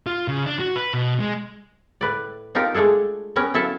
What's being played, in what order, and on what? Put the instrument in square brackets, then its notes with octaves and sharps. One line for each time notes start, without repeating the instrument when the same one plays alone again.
[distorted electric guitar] F4
C#3
D4
F#4
B4
B2
G#3
[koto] A2 B4 D5
D4 D#4 F4 G4 A#4
G#3 A3 D4 G#4 A4
G3 B3 C#4 A#4
F#3 E4 A4 E5 F5 A5